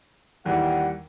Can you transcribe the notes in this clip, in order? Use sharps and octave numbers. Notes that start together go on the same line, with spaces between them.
D#2 E3 G3 F#5